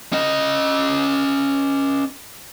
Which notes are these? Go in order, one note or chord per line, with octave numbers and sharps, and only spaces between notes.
C#4 D#5